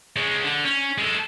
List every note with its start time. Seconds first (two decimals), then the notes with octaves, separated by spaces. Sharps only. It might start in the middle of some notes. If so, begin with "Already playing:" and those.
0.16 G#3 C#4
0.43 D3
0.65 C#4
0.98 G#3 A4